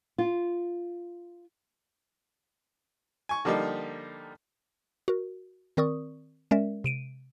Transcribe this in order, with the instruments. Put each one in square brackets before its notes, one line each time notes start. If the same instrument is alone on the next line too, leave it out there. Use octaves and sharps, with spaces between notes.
[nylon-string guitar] F4
[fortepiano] G#5 C#6
D3 F3 G3 A#3 D#4
[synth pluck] F#4 A#4
D#3 C4 A#4 D5 C#6 D#6
G#3 C#4 A#4 D5 E5
C3 D7 D#7